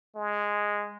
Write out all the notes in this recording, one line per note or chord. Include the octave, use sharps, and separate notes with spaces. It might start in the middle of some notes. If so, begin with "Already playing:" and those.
G#3